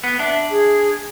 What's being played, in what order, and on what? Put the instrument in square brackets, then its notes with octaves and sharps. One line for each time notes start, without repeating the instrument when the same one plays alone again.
[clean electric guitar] B3
[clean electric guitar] D4 [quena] E5
[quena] G#4